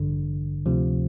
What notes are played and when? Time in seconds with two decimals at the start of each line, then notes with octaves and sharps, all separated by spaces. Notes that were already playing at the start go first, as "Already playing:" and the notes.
Already playing: A1 G2 D3
0.66 D2 C3 F3